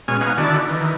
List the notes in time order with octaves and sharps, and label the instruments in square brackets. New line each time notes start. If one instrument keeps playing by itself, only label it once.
[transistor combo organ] B2 G#3 C#4 G#5 F6
B3 D#4 F5 F#5 G#5
D3 D#3 E4 F#4 A4 D5
D#3 E3